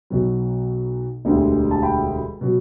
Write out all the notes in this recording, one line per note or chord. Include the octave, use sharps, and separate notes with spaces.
B1 B2 F#3
E1 D2 D3 G3
A5
G5 B5
B2 F#3